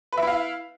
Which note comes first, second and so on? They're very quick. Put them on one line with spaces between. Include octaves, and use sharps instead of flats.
B4 E5 E4 F5